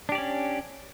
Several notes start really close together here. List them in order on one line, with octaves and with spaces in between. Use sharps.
D4 G4 D5 C#4